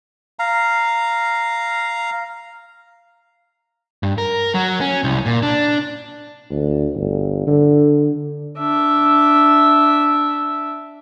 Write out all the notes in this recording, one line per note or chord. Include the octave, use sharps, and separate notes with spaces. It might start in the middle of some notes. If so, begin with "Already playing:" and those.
F5 A#5
G2
A#4
F#3
C#4
C2
A#2
D4
D2
G1
D3
D4 E5